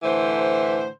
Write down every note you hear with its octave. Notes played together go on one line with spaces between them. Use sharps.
A2 D3 E3 C5